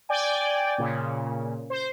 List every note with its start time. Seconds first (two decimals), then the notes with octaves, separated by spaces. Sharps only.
0.09 D5 G5 G#5
0.78 A#2 C#3
1.70 C5